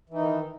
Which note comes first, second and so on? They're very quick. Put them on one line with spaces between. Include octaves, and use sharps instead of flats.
E3 D#4 D#3